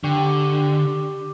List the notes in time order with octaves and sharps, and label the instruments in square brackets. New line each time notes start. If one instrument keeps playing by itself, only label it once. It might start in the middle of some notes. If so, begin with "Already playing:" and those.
[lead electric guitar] D3 [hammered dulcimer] G4 C#6 D6